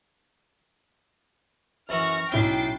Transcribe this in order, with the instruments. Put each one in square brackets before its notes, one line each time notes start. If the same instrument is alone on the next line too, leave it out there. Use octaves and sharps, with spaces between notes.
[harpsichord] F#2 E3 [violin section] C#6 F6 A#6
[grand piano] B1 E4 G7 [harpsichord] C#4 [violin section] G5 A6 C7